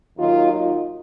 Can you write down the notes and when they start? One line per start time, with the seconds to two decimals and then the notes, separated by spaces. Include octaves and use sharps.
0.17 D#2 D#3 F#3 D#4 F4
0.51 D#4 F4